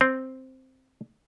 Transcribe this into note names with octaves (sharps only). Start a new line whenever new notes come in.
C4